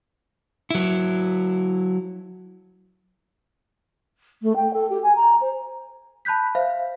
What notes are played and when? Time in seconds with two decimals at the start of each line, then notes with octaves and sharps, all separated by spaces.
0.70 F#3 E4
4.42 A3
4.55 G5
4.73 A4
4.90 G4
5.02 G#5
5.16 A#5
5.41 C5
6.25 A5 B5 F#6 G6 B6
6.55 C5 E5 F5